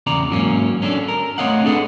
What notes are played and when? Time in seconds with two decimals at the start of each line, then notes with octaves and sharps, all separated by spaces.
0.07 E2 C#3 D5 A#5
0.31 G#2 F#3 A#3 C#4
0.82 C#4 D4 G4 A4
1.08 A#4
1.38 A3 C4 C#5 D#5 F5 F#5
1.65 D4 G#4 A4 B4 F#5